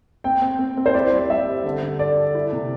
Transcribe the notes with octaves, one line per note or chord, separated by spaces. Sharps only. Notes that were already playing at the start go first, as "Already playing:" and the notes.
C4 G5
C4
C4
C4
C5
E4 D5
G3
G3 E5
G3
D3
D3
A4 D5
A4
E4
C3